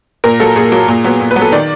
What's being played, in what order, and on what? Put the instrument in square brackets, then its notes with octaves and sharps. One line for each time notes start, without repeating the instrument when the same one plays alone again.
[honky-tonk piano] A#2 A#4
F#3 A#3 A4
A#2 G#4
F#3 A#3
A#2
F#3 B3
A#2
B4
F#3 B3
A4
D#3 D5